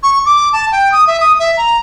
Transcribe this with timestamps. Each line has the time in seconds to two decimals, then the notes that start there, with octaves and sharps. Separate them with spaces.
0.03 C#6
0.26 D6
0.53 A5
0.72 G5
0.92 D#6
1.07 E5
1.20 D#6
1.40 E5
1.57 A#5